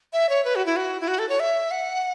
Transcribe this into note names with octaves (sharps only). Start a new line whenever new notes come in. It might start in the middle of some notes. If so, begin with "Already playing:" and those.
E5
C#5
B4
F#4
E4
F#4
E4
F#4
A4
C#5
E5
F#5